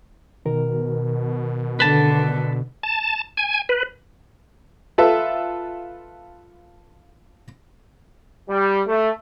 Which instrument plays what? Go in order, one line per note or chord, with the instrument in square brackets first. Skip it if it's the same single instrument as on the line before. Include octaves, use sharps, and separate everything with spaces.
[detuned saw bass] B2 [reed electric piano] D#3 A#4
[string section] D3 [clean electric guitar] B4 A5
[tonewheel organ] A5
G#5
B4
[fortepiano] F4 A4 B4 E5
[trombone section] G3
A3